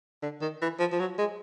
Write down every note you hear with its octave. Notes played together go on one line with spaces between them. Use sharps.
D3
D#3
E3
F3
F3
F#3
G#3